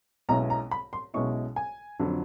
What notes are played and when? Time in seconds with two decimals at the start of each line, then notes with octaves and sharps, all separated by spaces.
0.29 B1 B2 G#3 C#4 E4 A#5
0.50 A#5
0.71 B5
0.93 C6
1.14 B1 B2 G#3 C#4 E4 C#6
1.56 G#5
2.00 F2 D3 F#3